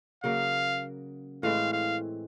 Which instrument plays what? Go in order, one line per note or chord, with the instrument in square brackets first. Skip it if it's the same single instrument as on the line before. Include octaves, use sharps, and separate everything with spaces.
[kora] C#3 F#3 A#3 [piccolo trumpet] F5
[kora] A2 E3 G#3 C4 [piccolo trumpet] F5
[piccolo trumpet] F5